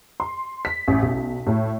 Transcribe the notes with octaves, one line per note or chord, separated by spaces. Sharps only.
C6
B6
A1
B1
A2